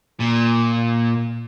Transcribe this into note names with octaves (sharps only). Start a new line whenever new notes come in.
A#2